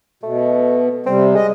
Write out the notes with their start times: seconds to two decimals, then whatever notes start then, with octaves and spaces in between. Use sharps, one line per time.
0.23 B2 A3
1.06 C3 G3 C4
1.35 G#3 D#5